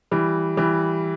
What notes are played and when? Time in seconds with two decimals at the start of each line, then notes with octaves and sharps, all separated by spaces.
0.11 E3 G3
0.57 E3 G3